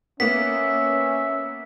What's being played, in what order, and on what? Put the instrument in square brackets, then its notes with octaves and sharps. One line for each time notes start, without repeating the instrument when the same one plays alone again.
[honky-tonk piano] A#3 B3 [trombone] C#4 [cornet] E5 [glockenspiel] B6